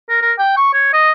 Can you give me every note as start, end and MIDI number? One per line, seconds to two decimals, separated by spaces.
0.09 0.17 70
0.22 0.33 70
0.39 0.55 79
0.57 0.73 85
0.74 0.90 73
0.93 1.12 75